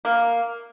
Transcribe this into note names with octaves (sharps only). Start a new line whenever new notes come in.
A#3